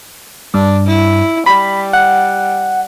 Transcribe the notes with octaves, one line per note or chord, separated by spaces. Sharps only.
G2 D4
E4
G3 B5
F#5